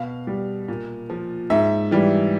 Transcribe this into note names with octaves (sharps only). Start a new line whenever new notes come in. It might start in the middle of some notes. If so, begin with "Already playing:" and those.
Already playing: B2 F5
G3
A#2
F3
G#2 E5
E3 G3